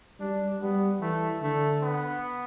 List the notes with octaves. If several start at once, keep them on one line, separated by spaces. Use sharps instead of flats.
G3 D4
G3 B3
E3 A3
D3 A3
B3